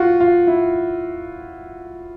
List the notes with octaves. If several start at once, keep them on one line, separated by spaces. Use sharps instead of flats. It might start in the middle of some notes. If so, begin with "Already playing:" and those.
Already playing: F4 F#4
F4
E4